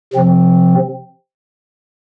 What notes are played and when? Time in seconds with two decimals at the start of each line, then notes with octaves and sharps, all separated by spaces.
0.13 C3 F3 C4